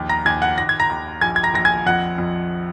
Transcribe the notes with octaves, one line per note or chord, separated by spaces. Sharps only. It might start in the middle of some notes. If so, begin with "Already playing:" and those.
Already playing: A#1 D#2
A#5 A#6
D#2 G#5 G#6
F#5 F#6
D#2 A#6
G#6
A#5 A#6
D#2
A#1 G#5 G#6
G#6
A#5 A#6
A#1 A#6
G#5 G#6
F2 F#5 F#6
F2